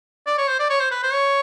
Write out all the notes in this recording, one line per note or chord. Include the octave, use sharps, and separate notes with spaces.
D5
C#5
C5
D5
C#5
C5
B4
C5
C#5